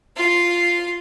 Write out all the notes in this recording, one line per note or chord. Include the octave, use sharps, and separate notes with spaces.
F4 C6